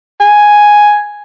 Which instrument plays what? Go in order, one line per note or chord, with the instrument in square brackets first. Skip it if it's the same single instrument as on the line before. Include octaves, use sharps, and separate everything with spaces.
[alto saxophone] G#5